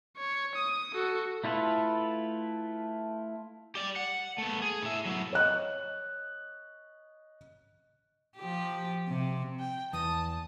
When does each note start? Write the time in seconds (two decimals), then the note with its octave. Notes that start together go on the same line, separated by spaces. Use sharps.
0.17 C#5
0.55 D#6
0.94 F#4 A4
1.44 A3 E4 F4 A4 B4
3.75 G4 D5
3.96 F#5
4.38 A3 B3
4.62 G#4
4.83 A2 E5
5.05 F#3 E4
5.33 C#5 D#5 F#6
8.37 F3 G4
9.08 C3
9.60 G5
9.93 E2 A5 D#6